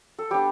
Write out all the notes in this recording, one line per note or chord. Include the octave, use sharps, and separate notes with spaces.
A4
G3 B3 D4 G4